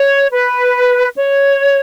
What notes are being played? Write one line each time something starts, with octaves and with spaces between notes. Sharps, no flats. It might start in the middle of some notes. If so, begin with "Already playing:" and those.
Already playing: C#5
B4
C#5